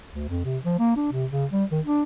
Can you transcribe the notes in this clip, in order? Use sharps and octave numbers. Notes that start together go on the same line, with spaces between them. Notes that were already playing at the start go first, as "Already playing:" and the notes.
D2
F2
C3
F3
A#3
D4
C3
C#3
G3
D#3
D4